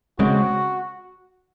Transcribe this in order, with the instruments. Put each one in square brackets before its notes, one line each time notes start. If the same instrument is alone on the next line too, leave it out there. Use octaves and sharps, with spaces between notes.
[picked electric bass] C#3 G#3 C4 [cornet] F#4